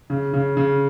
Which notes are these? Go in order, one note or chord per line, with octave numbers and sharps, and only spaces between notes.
C#3
C#3
C#3